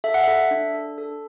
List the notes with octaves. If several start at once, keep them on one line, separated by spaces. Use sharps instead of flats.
A4 E5
F#5
A4 E5
D4
A4
A4